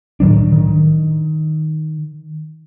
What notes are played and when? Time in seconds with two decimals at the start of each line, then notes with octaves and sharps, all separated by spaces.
0.20 A2 D#3 F#3 D4
0.52 D#3